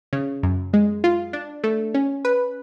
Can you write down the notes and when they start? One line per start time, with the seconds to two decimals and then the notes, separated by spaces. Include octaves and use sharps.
0.13 C#3
0.43 F#2
0.73 G#3
1.04 F4
1.33 D4
1.64 A3
1.94 C#4
2.25 B4